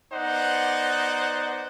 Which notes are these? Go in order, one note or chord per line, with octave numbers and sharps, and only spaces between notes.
B3 D#4 C5 D5 F#5